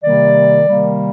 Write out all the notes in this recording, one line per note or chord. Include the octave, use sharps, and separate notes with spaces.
C3 D#3 G3 A#3 D5
C3 D#3 G3 A#3